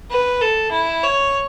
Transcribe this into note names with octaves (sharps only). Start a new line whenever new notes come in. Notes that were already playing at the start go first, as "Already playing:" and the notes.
B4
A4
E4
C#5